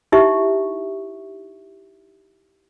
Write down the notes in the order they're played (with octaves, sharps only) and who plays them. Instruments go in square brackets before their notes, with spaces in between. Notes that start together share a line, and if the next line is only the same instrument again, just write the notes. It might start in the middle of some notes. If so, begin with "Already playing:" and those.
[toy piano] D#4 E4 G4 E5 C#6